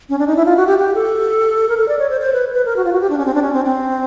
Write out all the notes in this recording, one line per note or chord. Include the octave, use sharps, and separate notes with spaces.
C#4
D4
D#4
E4
F4
F#4
G4
G4
A4
A#4
A4
D5
C#5
C5
C5
B4
B4
A#4
F#4
F4
F#4
G4
D4
C#4
C4
D4
C#4
C4
C4